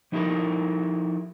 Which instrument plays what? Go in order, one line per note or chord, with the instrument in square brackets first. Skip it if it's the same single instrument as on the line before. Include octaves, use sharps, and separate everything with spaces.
[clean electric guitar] F3 D#4 E4 G4 A4 A#4